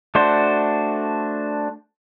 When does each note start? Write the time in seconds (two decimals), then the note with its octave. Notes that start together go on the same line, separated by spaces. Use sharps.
0.15 A3 D4 F#4 C5